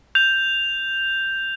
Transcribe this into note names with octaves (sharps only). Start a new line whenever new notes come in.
G6 F7